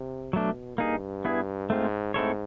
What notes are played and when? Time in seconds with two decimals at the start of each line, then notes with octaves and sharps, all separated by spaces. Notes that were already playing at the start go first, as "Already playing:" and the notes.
Already playing: C3
0.33 B2 F#3 A3 D4
0.78 G2 A#3 D#4 G#4
1.25 B3 E4 G#4
1.70 G#2 A3 C4 F4
2.14 G#2 A3 C4 E4 A4 C#5